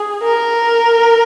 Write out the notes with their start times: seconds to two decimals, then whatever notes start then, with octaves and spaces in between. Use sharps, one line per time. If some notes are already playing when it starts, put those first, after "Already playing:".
Already playing: G#4
0.23 A#4